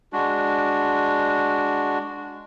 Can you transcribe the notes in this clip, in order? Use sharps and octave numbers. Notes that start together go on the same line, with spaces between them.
G#3 D4 F#4